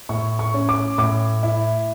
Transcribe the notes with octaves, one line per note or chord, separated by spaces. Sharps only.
A2 C#6
C#6
C#4
D6
A2 D6
E4